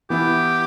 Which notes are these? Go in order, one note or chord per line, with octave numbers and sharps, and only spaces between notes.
E3 B3 E4 G4